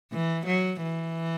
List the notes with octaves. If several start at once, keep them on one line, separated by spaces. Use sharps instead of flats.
E3
F#3
E3